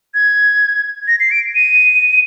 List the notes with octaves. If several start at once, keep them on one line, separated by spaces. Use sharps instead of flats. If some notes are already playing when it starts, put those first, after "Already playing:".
G#6
A#6
C7
D7
D#7